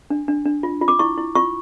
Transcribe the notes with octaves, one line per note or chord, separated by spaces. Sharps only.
D4
D4
D4
F4
F4
D6
E4 C#6
E4
F4 C#6